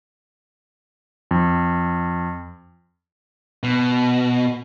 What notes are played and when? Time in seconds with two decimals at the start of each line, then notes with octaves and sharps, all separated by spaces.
1.31 F2
3.63 B2